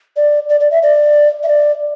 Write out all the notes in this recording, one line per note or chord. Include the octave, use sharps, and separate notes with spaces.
D5
D5
D5
E5
D5
E5
D5